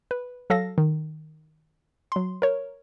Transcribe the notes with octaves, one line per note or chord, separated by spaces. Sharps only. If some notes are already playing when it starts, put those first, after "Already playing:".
B4
F#3 A4 F5 A#6
D#3
F#3 C6
A#4 C#5